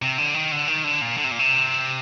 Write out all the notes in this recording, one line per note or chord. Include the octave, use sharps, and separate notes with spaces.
C3
D3
D#3
D3
D#3
D3
A#2
D3
C3
A#2
C3